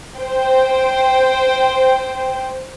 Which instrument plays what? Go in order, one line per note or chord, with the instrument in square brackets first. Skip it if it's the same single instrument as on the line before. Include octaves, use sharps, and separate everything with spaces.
[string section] C5 G5